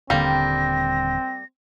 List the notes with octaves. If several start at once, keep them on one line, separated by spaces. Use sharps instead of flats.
D#1 D3 G3 A#3 C4 A#6